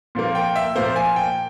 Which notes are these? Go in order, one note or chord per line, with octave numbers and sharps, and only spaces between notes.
A#2 F3 A#3
G5
E5
A#2 F3 A#3 C5
G#5
G5